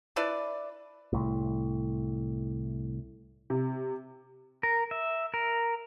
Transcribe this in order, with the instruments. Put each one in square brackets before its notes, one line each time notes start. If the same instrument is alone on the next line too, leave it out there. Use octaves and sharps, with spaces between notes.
[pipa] D4 E4 B4 D5
[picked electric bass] C2 A2
[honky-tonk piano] C3
[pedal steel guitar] A#4
E5
A#4